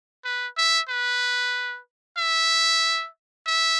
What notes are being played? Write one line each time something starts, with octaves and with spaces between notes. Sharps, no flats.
B4
E5
B4
E5
E5